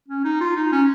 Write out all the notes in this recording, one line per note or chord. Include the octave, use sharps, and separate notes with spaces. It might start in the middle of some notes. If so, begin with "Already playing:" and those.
C#4
D#4
F4
D#4
C#4